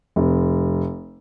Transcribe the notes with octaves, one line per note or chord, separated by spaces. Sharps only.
F1